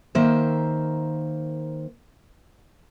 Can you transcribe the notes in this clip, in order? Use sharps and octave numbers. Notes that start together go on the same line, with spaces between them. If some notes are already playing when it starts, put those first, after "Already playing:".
D#3 A#3 C5 E5